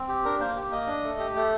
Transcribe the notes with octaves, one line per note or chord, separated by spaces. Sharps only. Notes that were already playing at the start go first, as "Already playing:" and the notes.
Already playing: C4
G4
D4 A#4
A#3 C5
G4
A#3 D#5
D4
A3
G4
A3